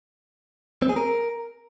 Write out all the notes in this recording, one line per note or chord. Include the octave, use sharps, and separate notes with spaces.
C4
G#4
A#4